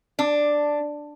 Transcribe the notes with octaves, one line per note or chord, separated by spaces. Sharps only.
D4